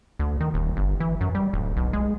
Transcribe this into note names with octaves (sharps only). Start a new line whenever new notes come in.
D2
D#3
D#1
G1
E3
F#2
G3
D1
B1
G#3